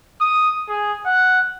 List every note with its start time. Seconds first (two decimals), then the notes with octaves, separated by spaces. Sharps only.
0.21 D#6
0.69 G#4
1.06 F#5